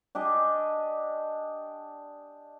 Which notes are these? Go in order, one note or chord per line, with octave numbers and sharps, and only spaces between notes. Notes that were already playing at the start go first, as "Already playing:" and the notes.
D4 G4 D#5 G#5